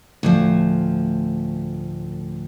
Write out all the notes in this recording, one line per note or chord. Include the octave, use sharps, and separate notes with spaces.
D2 A2 F3